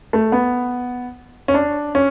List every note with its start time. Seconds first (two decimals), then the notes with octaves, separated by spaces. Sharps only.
0.13 A3
0.32 B3
1.48 C#4
1.54 D4
1.95 C#4